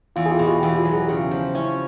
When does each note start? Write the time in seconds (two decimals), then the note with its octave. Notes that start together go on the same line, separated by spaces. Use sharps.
0.16 E2 F4
0.26 G#4
0.31 F4 G4
0.39 B2
0.47 F4 G4
0.62 E2 F4
0.77 F4 G4
0.85 F#3
0.93 F#4 G#4
1.08 C#3 F4 G4
1.31 F3
1.55 C#4 E4